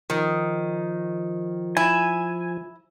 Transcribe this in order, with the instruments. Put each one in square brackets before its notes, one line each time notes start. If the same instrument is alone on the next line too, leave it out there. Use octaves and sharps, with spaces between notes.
[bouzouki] D#3 [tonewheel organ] F3
[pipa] E4 [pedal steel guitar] G#5